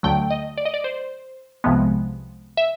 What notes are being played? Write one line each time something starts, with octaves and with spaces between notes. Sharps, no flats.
D2 D3 F#3 A3 G5
D#5
D5
D#5
D5
C5
C2 C3 F3 G#3 B3
E5